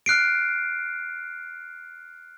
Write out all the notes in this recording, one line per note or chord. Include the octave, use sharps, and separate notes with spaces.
F6 F#6 C7 D7